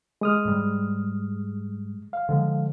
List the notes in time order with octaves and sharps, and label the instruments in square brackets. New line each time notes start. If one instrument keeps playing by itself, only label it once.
[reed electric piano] G#3 D#6 F6
[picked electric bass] G#2 G3
[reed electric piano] F5
[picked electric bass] D3 F3 G#3